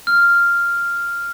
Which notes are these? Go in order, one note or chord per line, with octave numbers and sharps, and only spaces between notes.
F6